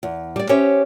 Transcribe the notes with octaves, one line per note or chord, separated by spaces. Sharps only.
E2
G3 D5
C#4 G4 C5 C#5 E5